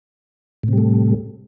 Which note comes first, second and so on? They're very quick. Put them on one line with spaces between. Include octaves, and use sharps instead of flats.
A2 C3 G3 A3